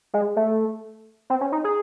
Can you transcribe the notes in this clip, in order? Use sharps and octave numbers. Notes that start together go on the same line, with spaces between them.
G#3
A3
C4
C#4
D#4
G#4